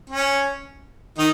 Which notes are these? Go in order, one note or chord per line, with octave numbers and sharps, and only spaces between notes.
C#4
D#3 D#4